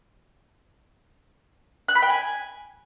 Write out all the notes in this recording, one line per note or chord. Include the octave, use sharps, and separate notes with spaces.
F#6
B5
G5
G#5